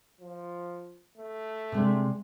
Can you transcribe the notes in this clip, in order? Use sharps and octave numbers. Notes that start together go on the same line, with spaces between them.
F3
A3
C3 G#3 D4